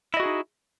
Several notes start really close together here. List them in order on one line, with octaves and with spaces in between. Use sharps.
E4 D#5 F#4 G#4 D#4